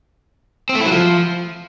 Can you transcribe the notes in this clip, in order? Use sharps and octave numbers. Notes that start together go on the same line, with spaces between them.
C4
A3
E4
F#3
F3